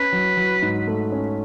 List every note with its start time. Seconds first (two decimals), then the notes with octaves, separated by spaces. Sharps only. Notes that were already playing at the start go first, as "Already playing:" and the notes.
Already playing: C#4 B4
0.12 F#3
0.37 F#3
0.62 G#2
0.87 A3
1.12 C#4